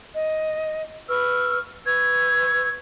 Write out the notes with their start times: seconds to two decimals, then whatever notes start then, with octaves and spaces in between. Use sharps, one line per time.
0.16 D#5
1.09 B4 C#6 E6 F6
1.86 B4 C#6 E6 G#6